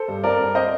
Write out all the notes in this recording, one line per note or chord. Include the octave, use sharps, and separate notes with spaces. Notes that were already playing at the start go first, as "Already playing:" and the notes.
Already playing: A4 C5
G2
C4 A#4 D5
G2
C4 C5 D#5